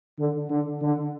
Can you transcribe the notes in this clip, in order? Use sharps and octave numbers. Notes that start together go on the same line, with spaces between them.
D3
D3
D3